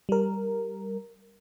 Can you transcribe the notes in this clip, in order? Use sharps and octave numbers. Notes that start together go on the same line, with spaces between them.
G3 A#4